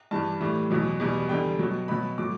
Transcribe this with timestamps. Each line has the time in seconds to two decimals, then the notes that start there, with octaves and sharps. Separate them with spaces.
0.11 G2 E3 G3 A5
0.40 A2 E3 G3
0.71 E2 B2 F#3
1.00 E2 B2 G3
1.29 E2 D3 G3 G5
1.59 B2 F#3
1.88 B2 F#3 B5
2.18 A2 F#3 D6